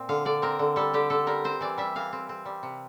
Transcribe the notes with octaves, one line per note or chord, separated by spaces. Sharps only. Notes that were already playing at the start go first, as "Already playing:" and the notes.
Already playing: A#2 C4
D3 F5
D3 D5
C4 A#4
D3
G3 A4
D3 G4
D3 A4
G3 A#4
C4 C5
E3 D5
G3 E5
E3 F5
C4
C4
G3
C3